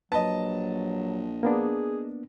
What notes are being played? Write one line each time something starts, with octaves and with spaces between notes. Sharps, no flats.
A#1 F#3 B4 D#5 A5
A#3 B3 D4 G#4